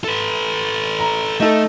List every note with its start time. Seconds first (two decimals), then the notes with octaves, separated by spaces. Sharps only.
0.04 A4 B4
1.00 A#5
1.40 A3 D#4 A4